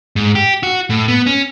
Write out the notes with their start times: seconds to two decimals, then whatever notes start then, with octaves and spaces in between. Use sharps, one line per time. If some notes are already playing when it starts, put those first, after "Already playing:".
0.16 G#2
0.35 G4
0.63 F#4
0.90 A2
1.08 B3
1.26 C#4